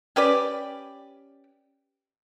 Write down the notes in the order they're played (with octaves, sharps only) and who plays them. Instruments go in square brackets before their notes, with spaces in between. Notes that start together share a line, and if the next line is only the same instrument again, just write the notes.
[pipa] C#4 G4 B4 D5